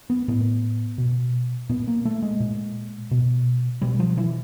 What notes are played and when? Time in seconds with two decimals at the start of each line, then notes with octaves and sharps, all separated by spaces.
0.10 B3
0.28 A2 B3
0.98 B2
1.69 A#2 B3
1.88 A#3
2.05 A3
2.22 G#3
2.40 A#2
3.11 B2
3.82 B2 G3
4.00 F3
4.18 E3